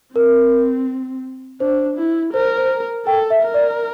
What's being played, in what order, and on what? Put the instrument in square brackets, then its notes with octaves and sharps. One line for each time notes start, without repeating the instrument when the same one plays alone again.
[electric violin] C4 [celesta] A#4
[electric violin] D4 [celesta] C5
[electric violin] E4
[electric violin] A#4 [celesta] C5
[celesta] C5
[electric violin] A4 [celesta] G5
[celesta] E5
[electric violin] A#4
[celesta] D5